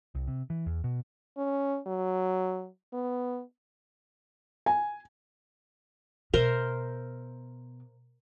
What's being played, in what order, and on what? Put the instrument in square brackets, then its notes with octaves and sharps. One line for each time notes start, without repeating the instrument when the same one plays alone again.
[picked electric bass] C2
C3
E3
E2
B2
[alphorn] C#4
F#3
B3
[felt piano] G#5
[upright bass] B2 [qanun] A#4 C5 E5